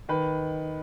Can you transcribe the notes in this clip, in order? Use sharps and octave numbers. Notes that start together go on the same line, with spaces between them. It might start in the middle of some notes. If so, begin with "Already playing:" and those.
D#3 B4